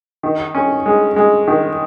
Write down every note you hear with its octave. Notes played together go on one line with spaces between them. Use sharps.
D#3
C#4
G#3
G#3
D#3